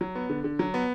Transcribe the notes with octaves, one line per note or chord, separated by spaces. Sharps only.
F#3
B3
D3
D3
F#3
B3